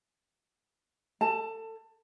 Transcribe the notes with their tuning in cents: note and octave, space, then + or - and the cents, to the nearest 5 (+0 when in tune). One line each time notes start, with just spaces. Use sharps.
A4 +25 A5 +20